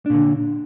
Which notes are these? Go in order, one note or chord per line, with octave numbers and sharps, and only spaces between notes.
A#2 D3 D4